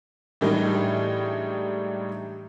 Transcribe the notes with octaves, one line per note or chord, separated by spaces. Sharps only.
A2 E3 G3 G#3 D4 D#4